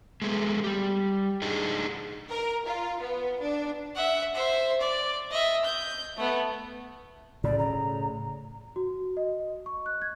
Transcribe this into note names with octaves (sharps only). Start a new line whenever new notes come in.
G#3 A3 B3
G3 G4
D4 D#4 G#4 D#5
A#4
F4
B3
D4
E5 F#5
C5 E5
D5
D#5 E5
G6
A3 B3
A2 C#3 D5
A#5
F#4
D#5
C#6
F#6
G#6